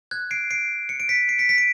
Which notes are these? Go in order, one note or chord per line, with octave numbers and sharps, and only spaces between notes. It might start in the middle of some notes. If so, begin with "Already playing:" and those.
F#6 G#6
C7 D7
C7 D7
C#7
D7
B6 C#7
C7 D7
B6 C#7
B6 C#7
D7